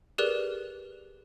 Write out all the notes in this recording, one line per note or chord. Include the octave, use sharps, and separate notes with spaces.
G4 G#4 A#4 B4 D5 F#6